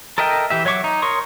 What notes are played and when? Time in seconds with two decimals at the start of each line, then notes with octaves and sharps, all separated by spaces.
0.18 A4 A#4 D#5 E5 G5
0.50 E3 G4 E5
0.65 F#3 C#5 E5 C#6 D6
0.84 D#4
1.02 A#4 C#5 C6 C#6 D#6